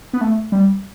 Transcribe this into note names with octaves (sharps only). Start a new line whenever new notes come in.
B3
A3
G3